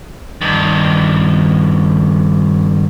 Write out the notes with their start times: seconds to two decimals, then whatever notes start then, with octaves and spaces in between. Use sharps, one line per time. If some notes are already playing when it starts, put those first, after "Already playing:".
0.42 G2 D#3